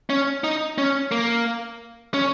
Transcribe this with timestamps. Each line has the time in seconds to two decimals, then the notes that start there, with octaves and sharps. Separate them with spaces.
0.10 C#4
0.44 D#4
0.78 C#4
1.12 A#3
2.14 C#4